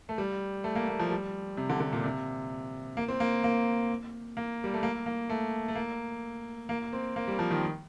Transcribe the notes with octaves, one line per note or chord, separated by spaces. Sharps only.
A3
G3
A3
A#3
A#3
F3
G3
C3
D3
D3
A#2
C3
A#3
C4
A#3
A#3
A#3
G3
A3
A#3
A#3
A3
A3
A#3
A#3
C4
A#3
G3
F3
D#3